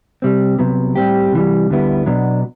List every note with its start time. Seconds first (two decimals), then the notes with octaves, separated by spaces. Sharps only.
0.22 C3 G3 C4
0.58 C2 C3 F#3 B3
0.95 A2 G3 C4 G4
1.33 C3 E3 G3
1.70 D2 D3 G3 B3 E4
2.06 B2 F#3 B3 D4